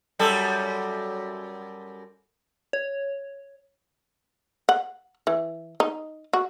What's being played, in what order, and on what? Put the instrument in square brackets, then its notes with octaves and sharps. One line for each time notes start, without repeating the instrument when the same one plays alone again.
[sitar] F#2 G3 A4
[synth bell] C#5
[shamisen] F#5
E3
D#4
F#4